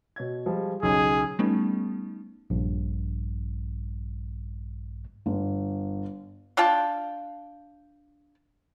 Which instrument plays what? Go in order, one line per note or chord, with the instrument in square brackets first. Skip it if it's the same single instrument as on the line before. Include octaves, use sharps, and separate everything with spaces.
[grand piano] B2 C#5 G#6
F3 G3 G#3
[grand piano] B1 C#3 [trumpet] G#4
[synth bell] G3 A3 B3 C#4 D#4
[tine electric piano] A#1 G2
[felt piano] G1
[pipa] D4 F4 G5 A5